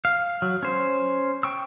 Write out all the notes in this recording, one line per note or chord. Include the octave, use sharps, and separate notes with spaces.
F5
F#3
C#4 C5
G5 C#6 E6